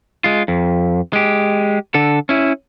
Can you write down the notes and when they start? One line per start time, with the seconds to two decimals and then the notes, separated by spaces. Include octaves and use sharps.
0.24 G#3 F4
0.48 F2
1.13 G#3 G4
1.94 D3 A4
2.29 C#4 E4